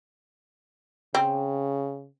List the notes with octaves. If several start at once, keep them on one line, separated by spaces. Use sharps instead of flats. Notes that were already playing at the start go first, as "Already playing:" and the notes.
C#3 C4